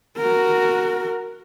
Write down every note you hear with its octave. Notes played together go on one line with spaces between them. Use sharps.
F#4 A#4